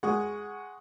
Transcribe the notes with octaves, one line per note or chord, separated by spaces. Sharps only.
G#3 F#5 C#6 D#6